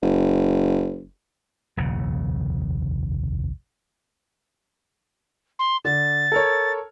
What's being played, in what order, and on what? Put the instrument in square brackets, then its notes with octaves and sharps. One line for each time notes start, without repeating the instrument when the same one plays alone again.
[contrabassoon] F#1
[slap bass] F1 A#1 D#2 C#3
[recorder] C6
[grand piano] D3 [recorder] A6
[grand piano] A4 A#4 C#5